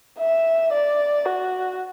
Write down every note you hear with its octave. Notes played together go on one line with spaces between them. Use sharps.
E5
D5
F#4